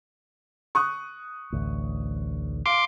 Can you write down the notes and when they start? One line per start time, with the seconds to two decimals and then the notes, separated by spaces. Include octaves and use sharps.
0.75 C#6 D#6 F#6
1.52 A1 D2
2.66 F5 C6 D6 D7